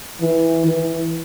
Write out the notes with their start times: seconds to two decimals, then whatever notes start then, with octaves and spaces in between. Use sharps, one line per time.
0.21 E3
0.66 E3